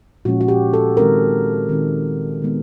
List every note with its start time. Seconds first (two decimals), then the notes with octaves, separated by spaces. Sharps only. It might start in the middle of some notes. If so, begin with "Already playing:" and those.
0.25 A#2 F3 G#3 C#4 F#4
0.41 F#4
0.48 G4
0.73 A4
0.97 D#3 G#3 C4 D#4 A#4
1.69 D#3 G#3 C4 D#4
2.42 D#3 G#3 B3 D#4